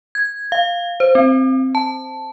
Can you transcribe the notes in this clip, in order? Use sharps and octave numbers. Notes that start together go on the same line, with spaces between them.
G#6
F5
C5
C4
A5